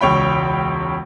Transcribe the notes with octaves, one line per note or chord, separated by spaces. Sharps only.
E1 C#2 C#5 G5 B5